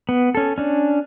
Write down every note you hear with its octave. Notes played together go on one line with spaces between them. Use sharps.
B3
C#4 A4
C#4 D4